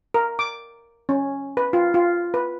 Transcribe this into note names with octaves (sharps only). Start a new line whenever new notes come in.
A#4
D6
C#4
B4
F4
F4
B4